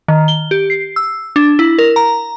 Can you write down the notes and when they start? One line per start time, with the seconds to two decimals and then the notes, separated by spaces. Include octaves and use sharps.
0.08 D#3
0.28 G7
0.51 G4
0.70 C7
0.96 E6
1.36 D4
1.59 E4
1.79 A#4
1.96 A#5